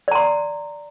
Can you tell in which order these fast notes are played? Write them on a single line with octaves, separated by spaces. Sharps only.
D5 A#5 C6